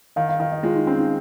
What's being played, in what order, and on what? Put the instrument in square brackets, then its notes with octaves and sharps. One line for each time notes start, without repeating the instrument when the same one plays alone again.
[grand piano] D#3 [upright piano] F5
[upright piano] F5
[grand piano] D#3 [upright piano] F5
[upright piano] D#5
[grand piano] G#3 [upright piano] F4
[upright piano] D#4
[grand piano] C4 [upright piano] C#4
[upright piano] D#4